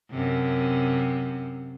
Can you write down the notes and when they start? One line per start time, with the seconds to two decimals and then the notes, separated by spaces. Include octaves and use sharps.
0.11 F#2 C3